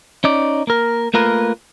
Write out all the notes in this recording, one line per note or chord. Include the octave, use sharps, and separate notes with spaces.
C#4 D#4 D5
A#3 A#4
A3 A#3 F4 A#4 B4